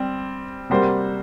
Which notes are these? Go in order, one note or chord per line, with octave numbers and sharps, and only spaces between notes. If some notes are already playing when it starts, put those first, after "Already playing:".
Already playing: G3 C4
C3 G3 A#3 F#4 C5